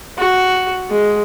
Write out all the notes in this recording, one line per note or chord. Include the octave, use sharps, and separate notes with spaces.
F#4
G#3